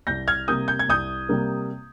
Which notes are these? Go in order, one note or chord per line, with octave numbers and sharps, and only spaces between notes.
C2 G6 A#6
F6 G#6
C3 G3 A#3 D#6 G6
G6
G#6
C2 D#6 G6
C3 G3 A#3